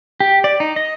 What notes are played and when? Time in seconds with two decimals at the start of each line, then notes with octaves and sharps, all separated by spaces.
0.20 G4
0.44 D5
0.60 D#4
0.76 D#5